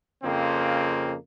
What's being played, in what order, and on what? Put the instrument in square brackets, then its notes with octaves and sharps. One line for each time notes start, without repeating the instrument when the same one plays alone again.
[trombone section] F2 C#3 F3 A#3 C4